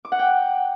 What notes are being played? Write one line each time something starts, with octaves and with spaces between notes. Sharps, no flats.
D6
F#5
G5